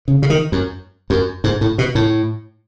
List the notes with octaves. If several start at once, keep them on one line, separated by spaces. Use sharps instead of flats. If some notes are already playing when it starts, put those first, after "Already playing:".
C#3
C#3
D#3
F#2
F#2
G#2
A2
B2
A2